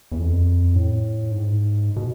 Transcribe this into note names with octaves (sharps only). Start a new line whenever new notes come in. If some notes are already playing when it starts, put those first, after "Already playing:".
E2
F2
A2
G#2
B2